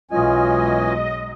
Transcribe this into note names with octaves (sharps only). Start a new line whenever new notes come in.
B1 E3 F#3 G#3 C#4 F4 D#5 G#5